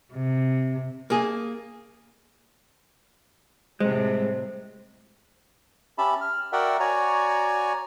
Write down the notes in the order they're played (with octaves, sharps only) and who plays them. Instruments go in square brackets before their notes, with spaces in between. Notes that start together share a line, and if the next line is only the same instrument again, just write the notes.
[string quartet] C3
[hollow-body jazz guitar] A#3 G#4
[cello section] A2 C3 G3 [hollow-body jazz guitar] G#3 [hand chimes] C5
[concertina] C#4 G4 E5 A5 B5
F6
F#4 A#4 D5 E5 F#5 G5
F#4 C#5 D5 G#5 A#5